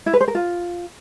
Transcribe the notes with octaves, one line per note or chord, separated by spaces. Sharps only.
E4
B4
C5
A#4
F4